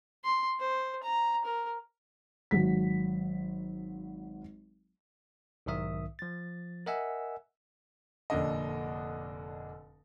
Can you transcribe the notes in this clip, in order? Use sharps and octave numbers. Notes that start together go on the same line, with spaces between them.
C6
C5
A#5
A#4
G#1 F#3 B6
B1 G#2 D#3 E5 D#6
F3 A6
A#4 D#5 E5 F#5 G#5 E6
F1 A#2 D3 D4 D#5